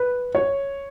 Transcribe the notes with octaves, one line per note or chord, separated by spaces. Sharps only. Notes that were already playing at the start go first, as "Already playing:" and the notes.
Already playing: B4
C#5